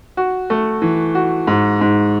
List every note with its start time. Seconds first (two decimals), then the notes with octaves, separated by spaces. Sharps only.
0.17 F#4
0.50 A3
0.82 E3
1.15 F#4
1.47 G#2
1.81 G#2